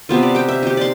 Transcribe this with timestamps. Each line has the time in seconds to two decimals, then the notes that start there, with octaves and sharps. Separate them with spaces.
0.09 C3 B3 F4
0.23 D5
0.35 G4 G5
0.48 E5
0.63 D#4 G4
0.77 D5 C6